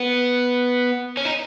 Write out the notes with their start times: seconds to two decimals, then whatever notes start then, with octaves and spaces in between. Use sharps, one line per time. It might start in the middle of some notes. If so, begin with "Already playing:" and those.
Already playing: B3
1.17 C#4
1.25 D#4